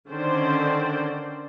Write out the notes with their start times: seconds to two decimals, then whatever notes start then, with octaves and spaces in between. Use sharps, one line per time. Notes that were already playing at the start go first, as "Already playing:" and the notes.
0.10 D3 D#3 C#4 C5 D5